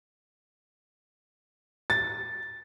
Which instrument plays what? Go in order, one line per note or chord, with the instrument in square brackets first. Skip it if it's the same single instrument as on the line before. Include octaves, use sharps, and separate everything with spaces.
[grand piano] A6